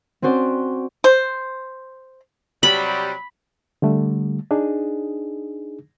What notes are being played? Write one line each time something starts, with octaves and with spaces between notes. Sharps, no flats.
C4 C#4 F#4 C5 D5
C5
C3 F#3 G3 B5
D3 G3 A3
D4 D#4 G#4